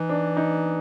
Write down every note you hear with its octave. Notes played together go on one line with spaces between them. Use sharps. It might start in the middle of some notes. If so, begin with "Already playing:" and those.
Already playing: E3 D#4
D4
D#4